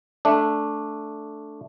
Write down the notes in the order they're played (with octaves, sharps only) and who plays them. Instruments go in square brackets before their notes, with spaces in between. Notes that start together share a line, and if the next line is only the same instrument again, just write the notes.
[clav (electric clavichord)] A3 D4